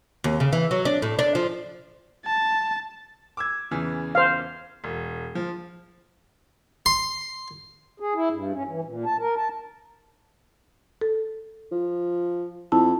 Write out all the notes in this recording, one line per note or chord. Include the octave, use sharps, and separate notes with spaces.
D#2
C#3
E3
F#3
D4
A2
D4
F3
A5
D6 E6 G#6
E2 C#3 E3
C5 F5
E1
F3
C6
G#4
E4
G2
C#4
E3
A#2
A5
A#4
A5
A4
F3
F2 E4 A5